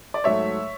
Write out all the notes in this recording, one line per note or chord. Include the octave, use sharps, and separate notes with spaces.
D5
G#2 F#3 A3 C#5 E5